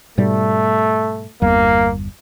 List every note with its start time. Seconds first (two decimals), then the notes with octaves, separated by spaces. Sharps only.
0.18 G#2 B2 G3 A3
1.42 G1 E2 G3 A#3